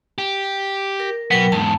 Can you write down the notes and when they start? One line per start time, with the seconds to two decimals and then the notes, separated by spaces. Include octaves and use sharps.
0.18 G4
1.00 A#4
1.31 B2 F#3 B3 A#4 G5
1.52 E2 G#2 A5